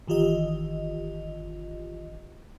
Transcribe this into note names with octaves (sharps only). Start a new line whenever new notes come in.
G1 D#3 E3 F4 G4 D#5